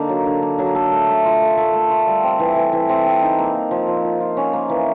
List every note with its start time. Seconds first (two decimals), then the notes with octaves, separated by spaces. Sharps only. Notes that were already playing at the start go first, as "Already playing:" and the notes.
Already playing: D3 A#3 D#4
0.09 F#3
0.26 D3
0.42 A#3
0.59 F#3
0.75 A4
0.92 A3
1.08 A3
1.24 F4
1.42 A4
1.57 A4
1.74 A3
1.90 F4
2.07 G3
2.24 C4
2.39 E3
2.56 E3
2.73 E3
2.89 C4
3.06 E3
3.22 D#4
3.39 A#3
3.54 A#3
3.71 F3
3.87 F3
4.05 F4
4.20 F4
4.37 C#4
4.53 A#3
4.69 E3